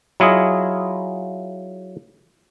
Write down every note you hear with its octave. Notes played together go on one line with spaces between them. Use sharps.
F#3 E4 F4 G#4 D#5